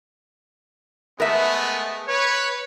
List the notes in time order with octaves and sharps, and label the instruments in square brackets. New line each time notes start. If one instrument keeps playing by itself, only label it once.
[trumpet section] G#3 A3 B3 [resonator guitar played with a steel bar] A#4 E5
[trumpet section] B4 C#5